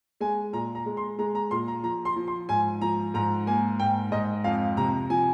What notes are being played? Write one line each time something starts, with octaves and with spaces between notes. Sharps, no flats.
G#3 G#5
A#2 A#5
A#5
G#3
C6
G#3 A#5
A#5
A#2 C6
A#5
F3 A#5
C6
F3
C6
G#2 G#5
F3 A#5
G#2 A#5
A#3 G#5
G#2 G5
G#2 D#5
F2 F5
C3 A#5
F3 G#5